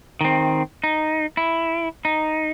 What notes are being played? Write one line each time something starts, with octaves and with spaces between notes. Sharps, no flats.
D#3 C4
D#4
E4
D#4